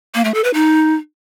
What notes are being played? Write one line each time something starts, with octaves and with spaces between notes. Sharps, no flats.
A#3
A3
A4
B4
D#4